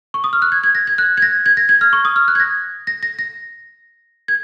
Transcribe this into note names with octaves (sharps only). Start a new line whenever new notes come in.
C#6
D#6
F6
F#6
G#6
G#6
A#6
G#6
F#6
G#6
A#6
G#6
A#6
G#6
F6
C#6
D#6
F6
F#6
G#6
A#6
A#6
A#6
A#6
G#6